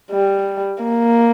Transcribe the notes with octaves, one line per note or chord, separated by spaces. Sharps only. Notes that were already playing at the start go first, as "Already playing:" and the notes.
G3
A#3